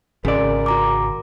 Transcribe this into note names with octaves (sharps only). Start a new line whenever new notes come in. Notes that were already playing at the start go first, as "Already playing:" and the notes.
G#1 C#3 A#4 D5
F#4 A#5 D6